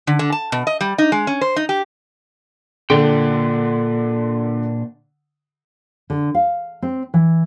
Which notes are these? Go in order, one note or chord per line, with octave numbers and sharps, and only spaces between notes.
D3
D3
A5
B2
D#5
G3
D#4
G#3
C#4
C5
D#4
G4
A#2 D3 D4 G5
D3
F5
C4
E3